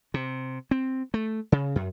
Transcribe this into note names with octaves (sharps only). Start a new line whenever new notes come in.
C3
C4
A3
C#3
F#2